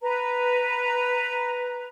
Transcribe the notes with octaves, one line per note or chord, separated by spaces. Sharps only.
B4 A#5